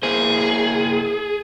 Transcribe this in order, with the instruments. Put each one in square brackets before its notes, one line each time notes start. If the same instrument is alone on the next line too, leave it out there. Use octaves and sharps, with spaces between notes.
[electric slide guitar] A#3 E4 C5 [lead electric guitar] G#4